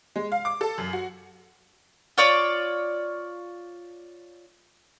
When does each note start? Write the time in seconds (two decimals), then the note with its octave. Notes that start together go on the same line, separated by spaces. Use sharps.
0.16 G#3
0.32 F5
0.45 D6
0.61 A4
0.78 F#2
0.93 F#4
2.18 F4 C#5 D5 D6